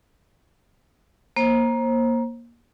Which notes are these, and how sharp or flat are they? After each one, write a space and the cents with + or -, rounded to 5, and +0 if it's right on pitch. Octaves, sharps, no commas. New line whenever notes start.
A#3 +15 C5 +30